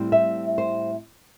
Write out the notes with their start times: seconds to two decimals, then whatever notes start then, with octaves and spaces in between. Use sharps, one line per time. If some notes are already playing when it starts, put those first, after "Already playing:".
Already playing: A2 G3 C4
0.12 E5
0.58 C5